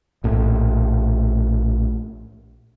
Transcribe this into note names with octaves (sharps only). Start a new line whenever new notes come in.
A#1 A2